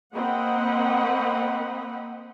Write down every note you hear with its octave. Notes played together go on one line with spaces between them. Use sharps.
A#3 C4 D#5 F#5 B5